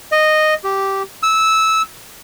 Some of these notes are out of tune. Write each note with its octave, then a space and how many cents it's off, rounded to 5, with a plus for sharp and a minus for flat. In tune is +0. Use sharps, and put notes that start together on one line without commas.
D#5 -10
G4 -10
E6 -15